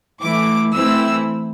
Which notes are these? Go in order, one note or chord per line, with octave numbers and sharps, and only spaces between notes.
E3 A3 E4 D6
E3 A3 C4 E4 E6